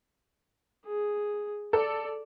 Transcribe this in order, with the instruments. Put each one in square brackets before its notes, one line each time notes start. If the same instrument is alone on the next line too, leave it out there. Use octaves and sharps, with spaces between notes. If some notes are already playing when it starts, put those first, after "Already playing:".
[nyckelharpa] G#4
[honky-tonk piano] A4 [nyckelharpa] D5